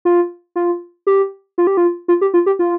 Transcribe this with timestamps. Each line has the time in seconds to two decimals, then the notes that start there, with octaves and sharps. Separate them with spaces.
0.05 F4
0.56 F4
1.07 G4
1.58 F4
1.67 G4
1.77 F4
2.08 F4
2.21 G4
2.34 F4
2.46 G4
2.59 F4